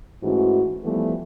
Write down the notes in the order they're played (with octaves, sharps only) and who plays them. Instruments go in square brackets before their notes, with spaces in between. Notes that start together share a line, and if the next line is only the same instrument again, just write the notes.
[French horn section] G#2 E3 A3 C#4 F#4
E3 F3 G3 A3 B3